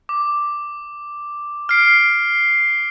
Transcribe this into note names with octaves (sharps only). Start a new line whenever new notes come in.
D6
F6 C7 D7